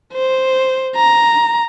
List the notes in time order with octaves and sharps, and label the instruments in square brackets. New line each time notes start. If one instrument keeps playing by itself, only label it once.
[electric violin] C5
A#5